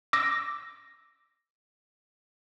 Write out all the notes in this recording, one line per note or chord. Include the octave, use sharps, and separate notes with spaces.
D6 E6 A#6